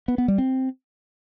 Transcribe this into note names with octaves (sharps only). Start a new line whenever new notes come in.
B3
B3
G3
C4